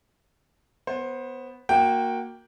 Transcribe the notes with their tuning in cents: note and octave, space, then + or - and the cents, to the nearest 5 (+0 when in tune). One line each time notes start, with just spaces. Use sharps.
B3 +0 C5 +20
A#3 +0 F#4 -20 G5 +0